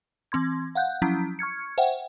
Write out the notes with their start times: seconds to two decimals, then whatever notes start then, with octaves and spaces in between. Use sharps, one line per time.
0.32 E3 C4 C6 G#6
0.75 F5 F#5 F#6 G6
1.02 F3 F#3 C#4 E4 G6
1.39 C#6 F6 G#6 C#7
1.78 C5 E5 F#5 G5